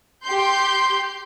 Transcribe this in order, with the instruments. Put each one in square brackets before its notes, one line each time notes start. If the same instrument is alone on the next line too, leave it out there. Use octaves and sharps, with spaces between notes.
[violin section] G4 C6 G6